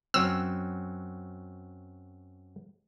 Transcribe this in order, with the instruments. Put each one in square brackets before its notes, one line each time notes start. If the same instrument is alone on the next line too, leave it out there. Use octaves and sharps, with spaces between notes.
[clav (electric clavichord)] F#2 F#3 C4 [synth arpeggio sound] E6